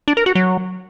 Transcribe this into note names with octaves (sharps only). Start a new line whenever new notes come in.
D4
A#4
F#4
F#3